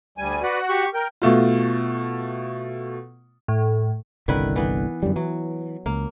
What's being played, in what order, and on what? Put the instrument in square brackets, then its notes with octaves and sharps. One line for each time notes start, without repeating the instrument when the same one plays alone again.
[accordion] D2 G3 G#5
[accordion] F#4 F#5 [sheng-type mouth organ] B4 D5
[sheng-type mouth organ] G4 C#6
[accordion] A#4 [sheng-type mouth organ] G5
[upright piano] B2 A3 F4
[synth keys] A2
[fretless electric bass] G1 C2 D3 [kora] D#3 E4 B4
[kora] E3 B3
[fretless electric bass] F#2 D3 G3
[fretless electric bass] E3 [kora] F#3
[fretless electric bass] C#2 [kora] A#3